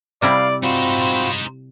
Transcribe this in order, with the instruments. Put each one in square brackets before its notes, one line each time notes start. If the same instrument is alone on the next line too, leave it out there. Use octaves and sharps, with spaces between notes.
[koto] C3 G3 E4 [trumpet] D5 [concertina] F5
[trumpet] C4 [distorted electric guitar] D#4 C5 [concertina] F4 F#4 B5